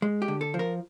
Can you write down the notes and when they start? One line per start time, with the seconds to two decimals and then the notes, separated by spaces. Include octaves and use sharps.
0.02 G#3
0.22 G4
0.28 D3
0.41 A4
0.54 F3
0.59 A#4